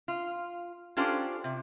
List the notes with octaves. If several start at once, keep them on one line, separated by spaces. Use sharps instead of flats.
F4
C#4 D4 F4 G4 A4 C5
C3